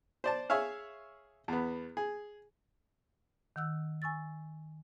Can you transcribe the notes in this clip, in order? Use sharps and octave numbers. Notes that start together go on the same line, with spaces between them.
C5 D5 A5
G#4 C#5 E5 F5
E2 B3
G#4
D#3 F#5 E6 F#6
G#5 C#6 E6 A6